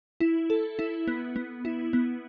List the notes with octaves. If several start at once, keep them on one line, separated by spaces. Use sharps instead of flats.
E4
A4
E4
B3
B3
E4
B3